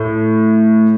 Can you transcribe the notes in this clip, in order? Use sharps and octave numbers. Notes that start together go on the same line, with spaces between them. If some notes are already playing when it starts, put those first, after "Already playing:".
Already playing: A2